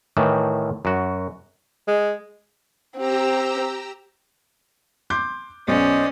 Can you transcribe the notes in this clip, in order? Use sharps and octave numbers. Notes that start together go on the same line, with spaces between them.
A2 D#3 E3
F#2 F#4
G#3
C4 G4 A#5 E6
C6 D6 G6
B1 C#4 C5 D5 D#5